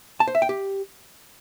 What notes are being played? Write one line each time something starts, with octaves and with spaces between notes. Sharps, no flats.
A5
C5
E5
G5
G4